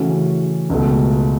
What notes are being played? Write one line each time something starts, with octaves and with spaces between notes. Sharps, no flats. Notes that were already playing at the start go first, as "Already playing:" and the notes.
Already playing: C#3 E3 A3 C#4 F#4
C#2 B2 A3